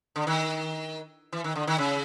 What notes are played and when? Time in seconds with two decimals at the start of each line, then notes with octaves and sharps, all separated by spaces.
0.16 D3
0.27 D#3
1.32 E3
1.44 D#3
1.55 D3
1.67 D#3
1.78 C#3